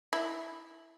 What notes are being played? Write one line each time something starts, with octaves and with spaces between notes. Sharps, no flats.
E4